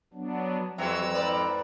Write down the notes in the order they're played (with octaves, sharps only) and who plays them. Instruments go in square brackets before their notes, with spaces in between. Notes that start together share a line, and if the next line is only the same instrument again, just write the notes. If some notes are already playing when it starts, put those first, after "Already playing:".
[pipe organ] F#3 B3 D4
[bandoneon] F2 C4 A#5 [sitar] E3 F#3 F#4 [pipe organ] E6
[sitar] G#2 B4 D5